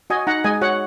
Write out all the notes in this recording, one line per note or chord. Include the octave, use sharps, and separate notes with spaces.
F#4 D#5 G#5
D#4 F#5 A#5
G#3 D#5 G#5
F#4 C#5 F#5